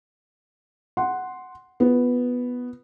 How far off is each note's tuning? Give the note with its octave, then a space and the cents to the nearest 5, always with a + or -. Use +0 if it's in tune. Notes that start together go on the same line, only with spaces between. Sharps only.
F#5 +0 C6 +0
B3 +0 F4 -15